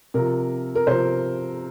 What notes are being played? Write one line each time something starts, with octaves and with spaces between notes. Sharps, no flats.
C3 F3 A#4
A#4
C3 F3 C5